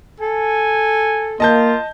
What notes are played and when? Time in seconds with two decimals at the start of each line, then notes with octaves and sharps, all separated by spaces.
0.20 A4 G#5
1.40 A#3 F4 D#5 A5 G6